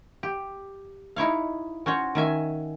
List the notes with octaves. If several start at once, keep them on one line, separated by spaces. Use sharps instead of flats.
G4
D#4 E4 C#5 F5
C#4 F#4 C5 C#5
D#3 C#4 E5 G#5